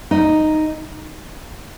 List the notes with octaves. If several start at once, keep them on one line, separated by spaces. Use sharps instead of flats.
D#4